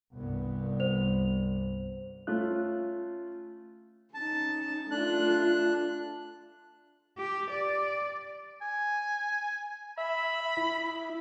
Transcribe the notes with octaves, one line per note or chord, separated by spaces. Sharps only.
C2 G2 B3
C5 F7
A3 C#4 F4 F#6
C#4 D#4 A5
A3 D4 F4 F#6
G4
D5
G#5
E5 B5
E4